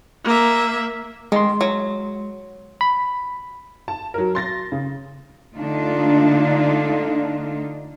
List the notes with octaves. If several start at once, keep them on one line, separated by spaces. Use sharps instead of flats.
A#3 E5
D#3 G#3 C6
F#3
B5
A5
F#3 A#4
C6 A6 A#6
C#3
D3 A3 D4 D#4 F4